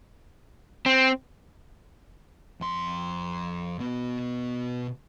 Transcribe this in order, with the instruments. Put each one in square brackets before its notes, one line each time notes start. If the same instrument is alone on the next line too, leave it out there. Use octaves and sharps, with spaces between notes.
[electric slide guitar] C4
[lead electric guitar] F2 C6
B2 B3